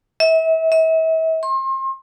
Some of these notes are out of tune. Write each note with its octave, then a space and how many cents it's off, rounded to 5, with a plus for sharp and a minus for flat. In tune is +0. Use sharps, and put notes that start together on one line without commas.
E5 -35
E5 -40
C6 +35